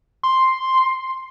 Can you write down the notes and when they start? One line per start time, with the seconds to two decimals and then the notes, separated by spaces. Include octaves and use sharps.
0.23 C6